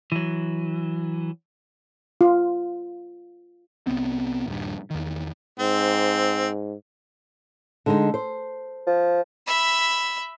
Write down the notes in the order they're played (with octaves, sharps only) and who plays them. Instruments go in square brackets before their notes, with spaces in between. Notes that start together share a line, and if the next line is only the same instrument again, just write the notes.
[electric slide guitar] E3 F#3
[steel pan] F4
[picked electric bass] C2 B3 C4
D#1 G2
E2 D#3
[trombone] G#2 [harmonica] C4
[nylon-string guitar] D3 G#3 D#4
C5
[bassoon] F3
[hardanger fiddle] E5 B5